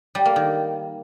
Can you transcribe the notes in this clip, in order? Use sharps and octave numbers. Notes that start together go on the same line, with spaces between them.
G3
A#3
D#3